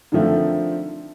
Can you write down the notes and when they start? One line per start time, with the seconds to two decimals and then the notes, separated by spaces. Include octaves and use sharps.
0.12 D3 D#3 F3 A3 C4